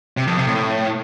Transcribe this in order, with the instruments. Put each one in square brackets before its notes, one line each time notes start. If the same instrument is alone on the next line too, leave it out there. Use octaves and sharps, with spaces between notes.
[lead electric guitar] C3
F2
C3
A2